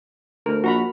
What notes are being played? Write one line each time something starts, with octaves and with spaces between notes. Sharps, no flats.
D2 A#4
A#1 F#4 A#5 B5